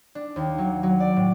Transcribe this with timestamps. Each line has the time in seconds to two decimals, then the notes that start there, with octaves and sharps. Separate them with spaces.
0.15 D4
0.36 D#2
0.58 F#3
0.83 F#3
1.00 D5
1.16 A2